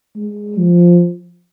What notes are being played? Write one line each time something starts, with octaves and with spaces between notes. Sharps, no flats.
G#3
F3